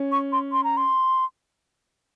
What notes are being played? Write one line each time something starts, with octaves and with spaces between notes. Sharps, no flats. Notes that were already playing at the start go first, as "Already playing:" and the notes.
Already playing: C#4
C#6
C6
C6
A#5
C6